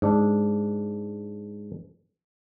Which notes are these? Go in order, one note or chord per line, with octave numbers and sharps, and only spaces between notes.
G#2 D4